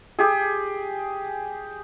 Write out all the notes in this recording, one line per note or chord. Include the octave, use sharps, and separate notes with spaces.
G4 G#4